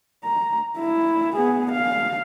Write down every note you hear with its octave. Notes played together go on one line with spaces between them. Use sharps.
A#5
E4
B3 G#4
F5